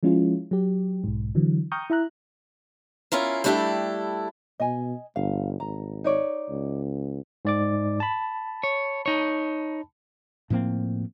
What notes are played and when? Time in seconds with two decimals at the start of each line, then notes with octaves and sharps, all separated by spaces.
0.03 F3 G#3 C#4 E4 F4
0.51 F#3 G4
1.04 B1 G#2
1.35 D3 E3 F#3
1.72 G5 A#5 C#6 D#6 F6 G6
1.90 E4 E5 A#5 F#6
3.12 C#4 E4 F4 A#4
3.44 G3 A3 D4 E4 G4 A4
4.60 B2 D#5 G#5
5.16 G1 F5
5.60 G#1 A#5
6.04 D#4 C#5 D5
6.49 C#2
7.45 G#2 D5 D6
8.00 A5 B5
8.63 C#5
9.06 D#4 C#5
10.50 A2 F3 A#3 C4